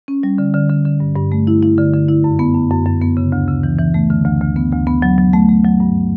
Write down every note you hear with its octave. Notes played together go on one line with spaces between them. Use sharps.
C#4
G3
D3
D3
D3
D3
G2
G2
A3
E4
E4
D3
D3
E4
F#2
B3
F#2
F#2
F#2
B3
C#3
D2
C#3
E3
E3
A3
D3
D2
D2
B3
D2
B3
F#3
F#3
A3
A3
F#3
G2